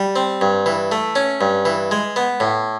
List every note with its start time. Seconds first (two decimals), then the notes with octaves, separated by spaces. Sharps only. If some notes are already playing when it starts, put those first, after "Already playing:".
Already playing: G3
0.16 C4
0.41 G2
0.66 E3
0.92 A3
1.16 C#4
1.41 G2
1.65 E3
1.91 G#3
2.16 B3
2.40 A2